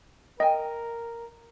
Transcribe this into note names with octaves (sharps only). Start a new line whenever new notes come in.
A#4 D#5 G5 G#5